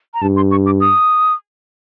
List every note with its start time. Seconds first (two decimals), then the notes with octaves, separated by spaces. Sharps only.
0.14 A#5
0.22 G2 A5
0.36 C6
0.51 C#6
0.66 D6
0.81 D#6